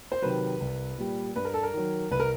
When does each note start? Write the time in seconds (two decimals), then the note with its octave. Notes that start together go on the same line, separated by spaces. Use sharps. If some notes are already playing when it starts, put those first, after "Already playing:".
0.12 C5
0.22 C3 D#3 F#3 B4
0.60 C2
0.98 A#2 G3
1.36 G2 B4
1.45 A#4
1.54 A4
1.63 A#4
1.74 D#3 F#3
2.11 C2 B4
2.20 A#4